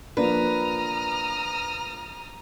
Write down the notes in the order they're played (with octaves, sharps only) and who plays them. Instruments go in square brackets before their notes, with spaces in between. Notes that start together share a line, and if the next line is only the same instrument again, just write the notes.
[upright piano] F3 A#3 D4 [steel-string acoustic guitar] B4 [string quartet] A#5 D#6 F6